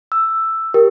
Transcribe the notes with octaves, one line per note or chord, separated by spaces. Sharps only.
E6
G4 A#4